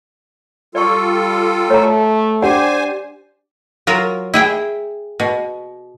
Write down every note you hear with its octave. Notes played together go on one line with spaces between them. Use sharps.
G3 F4 A4 D5 C#6
A3 C#5 A#5
D4 G4 C5 D5 F#5 G#5
F#3 F4 A#4
E4 G#4 G5
B2